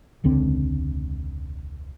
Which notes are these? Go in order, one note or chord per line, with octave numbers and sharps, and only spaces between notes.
E1 C#2 D3 C4